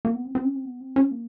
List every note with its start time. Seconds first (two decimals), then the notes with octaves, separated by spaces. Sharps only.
0.05 A#3
0.15 B3
0.25 C4
0.35 C4
0.45 C#4
0.55 C4
0.65 B3
0.81 C4
0.96 C#4
1.11 A#3